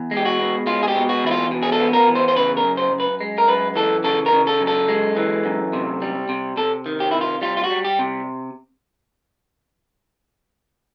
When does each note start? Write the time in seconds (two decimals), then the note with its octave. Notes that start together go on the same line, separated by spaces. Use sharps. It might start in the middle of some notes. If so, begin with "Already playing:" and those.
Already playing: E2
0.11 G#3
0.17 G4
0.25 F#4
0.40 B2
0.66 G#3 F4
0.83 G#4
0.88 G4
0.95 B2
1.09 F#4
1.24 E2 E4
1.31 F4
1.51 B2
1.63 G#4
1.72 A4
1.80 B3
1.93 A#4
2.08 E2
2.15 C5
2.28 C5
2.36 C#3 B4
2.57 A#4
2.64 F#2
2.77 C5
2.93 F#2
3.00 B4
3.21 G#3
3.38 A#4
3.48 F#2 B4
3.76 E3 A4
4.04 C#3 A4
4.26 A#4
4.33 C#3
4.47 A4
4.61 F#2
4.67 A4
4.88 G#3
5.17 E3
5.45 F#2
5.73 C3
6.02 G3
6.29 C3
6.57 C3 A4
6.86 D#3
7.00 G4
7.11 C3 E4
7.21 F4
7.42 G3 F4
7.57 F4
7.64 F#4
7.70 G3
7.85 G4
7.99 C3